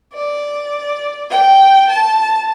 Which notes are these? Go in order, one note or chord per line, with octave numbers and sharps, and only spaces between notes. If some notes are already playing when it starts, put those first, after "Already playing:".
D5
G5
A5